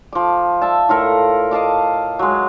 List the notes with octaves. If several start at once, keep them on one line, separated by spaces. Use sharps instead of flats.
F3 D6
D5 E5 A5
A2 F4 A4 A#4
D#5 F5 A5 D6
F#3 G#3